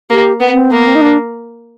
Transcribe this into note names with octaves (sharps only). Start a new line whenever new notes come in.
A#3 G4
B3
C4
A#3 B3
C4
D#4
D4